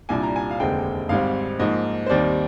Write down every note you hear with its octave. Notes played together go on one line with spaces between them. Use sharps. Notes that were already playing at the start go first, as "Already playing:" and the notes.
C2 A#2 G3 D4 G#5
A#5
G#5
F5
F1 D#2 D3 G#3 C4 G5
G#1 G#2 G3 C4 F5
G#2 F3 A#3 D#5
C5
D#2 D#3 G3 C4 D5